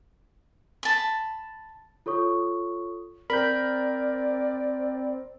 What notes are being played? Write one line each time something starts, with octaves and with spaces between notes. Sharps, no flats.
A5 B5
F4 A4 C#5 C#6 D#6
C4 A#4 D5 B5 G6